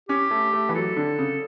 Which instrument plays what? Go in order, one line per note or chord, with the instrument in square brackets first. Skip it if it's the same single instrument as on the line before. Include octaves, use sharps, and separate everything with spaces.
[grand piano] C#4 [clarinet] G4
[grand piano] A3
A3
E3
[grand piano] F#3 [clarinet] A4
[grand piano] D3
C#3